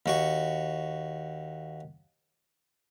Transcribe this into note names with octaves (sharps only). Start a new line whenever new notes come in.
D#2 F#4 C#6